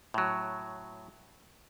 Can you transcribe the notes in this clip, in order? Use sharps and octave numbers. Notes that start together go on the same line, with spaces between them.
A2 F#3